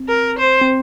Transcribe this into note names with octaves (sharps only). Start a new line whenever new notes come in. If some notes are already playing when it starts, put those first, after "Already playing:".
Already playing: C4
A#4
C5
C4